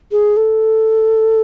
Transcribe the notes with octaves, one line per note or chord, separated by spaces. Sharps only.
G#4
A4